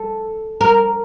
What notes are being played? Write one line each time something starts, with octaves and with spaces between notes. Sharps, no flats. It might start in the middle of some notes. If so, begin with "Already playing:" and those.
Already playing: A4
A#4